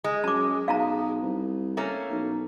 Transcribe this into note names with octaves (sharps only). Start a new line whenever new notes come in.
G#3
F#2 A5 D6
B1 F5 A5 A#5
C2
A3 A#3 C#4
B1